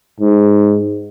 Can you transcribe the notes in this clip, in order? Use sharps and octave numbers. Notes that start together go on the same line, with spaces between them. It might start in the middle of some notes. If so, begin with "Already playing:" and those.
G#2